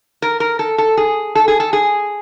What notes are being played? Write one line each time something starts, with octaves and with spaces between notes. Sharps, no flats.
A#4
A#4
A4
A4
G#4
A4
G#4
A4
G#4